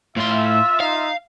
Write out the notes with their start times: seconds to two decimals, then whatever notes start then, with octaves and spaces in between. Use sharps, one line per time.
0.16 A2 F4 E5 C6
0.47 E6
0.80 D#4 F5